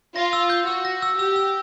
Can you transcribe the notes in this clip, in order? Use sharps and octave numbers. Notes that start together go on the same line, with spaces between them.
F4 A#6
E6
G6
F#4 E6
A#6
E6
G4 E6
E6